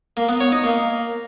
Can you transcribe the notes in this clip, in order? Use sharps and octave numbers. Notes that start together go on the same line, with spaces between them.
A#3
B3
C#5
D#4
A#3